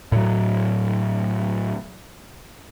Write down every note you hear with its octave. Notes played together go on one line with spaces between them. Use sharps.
A2 F#3